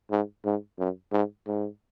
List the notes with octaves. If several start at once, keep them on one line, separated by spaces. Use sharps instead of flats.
G#2
G#2
F#2
G#2
G#2